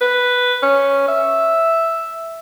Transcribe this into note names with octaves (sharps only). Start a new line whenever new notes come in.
B4
C#4
E5